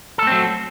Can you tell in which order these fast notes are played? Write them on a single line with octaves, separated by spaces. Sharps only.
A4 A3 C4 F#3